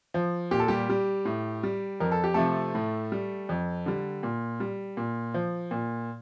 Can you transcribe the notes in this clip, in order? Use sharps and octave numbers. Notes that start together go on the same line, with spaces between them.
F3
A#2 G4
A4
G3 G4
G3
A2
G3
F2 A#4
A4
G4
C3 F3 A3 A4
A2
G3
F2
D3 G3
A#2
G3
A#2
F3
A#2